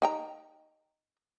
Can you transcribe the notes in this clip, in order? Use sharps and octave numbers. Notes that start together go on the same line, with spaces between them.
D#4 G5 A#5